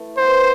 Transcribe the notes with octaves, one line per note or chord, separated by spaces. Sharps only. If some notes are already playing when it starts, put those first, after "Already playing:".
Already playing: E3 A3
B3 E4 B4 C5